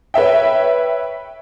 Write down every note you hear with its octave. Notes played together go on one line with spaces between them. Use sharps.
B4 C#5 E5 G5